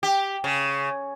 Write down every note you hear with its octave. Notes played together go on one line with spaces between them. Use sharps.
G4
C#3